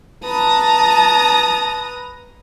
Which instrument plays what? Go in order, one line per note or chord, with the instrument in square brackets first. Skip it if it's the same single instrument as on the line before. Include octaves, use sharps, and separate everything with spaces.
[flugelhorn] B4 [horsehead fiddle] A5 [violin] A#5 D#6